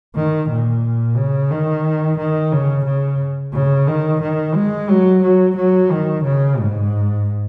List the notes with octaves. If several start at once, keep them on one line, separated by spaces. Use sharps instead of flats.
D#3
A#2
C#3
D#3
D#3
C#3
C#3
C#3
D#3
D#3
G#3
F#3
F#3
F#3
D#3
C#3
G#2